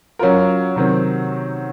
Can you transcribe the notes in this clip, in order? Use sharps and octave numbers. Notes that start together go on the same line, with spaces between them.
F#3 C#4 F4 A#4
C3 D#3 F#3 C4